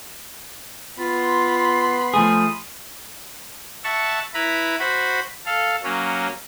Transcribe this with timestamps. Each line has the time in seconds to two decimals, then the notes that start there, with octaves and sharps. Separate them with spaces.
0.99 B3 F4 B5 C6
2.14 F3 A3 G#4 D#6
3.84 E5 F#5 A5 C#6
4.34 E4 B4 A#5 B5
4.79 F#4 C5 B5
5.46 A4 F5
5.84 F#3 A#3 C#4